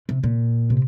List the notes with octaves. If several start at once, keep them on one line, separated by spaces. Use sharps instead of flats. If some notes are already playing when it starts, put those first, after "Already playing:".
C3
A#2
C3